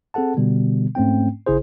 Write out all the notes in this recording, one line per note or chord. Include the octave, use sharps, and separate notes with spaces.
C4 G#4 A4 F#5 A5
B2 D3 G3 B3
G#2 A3 C4 C#4 G5
G#1 C#3 E4 G#4 C5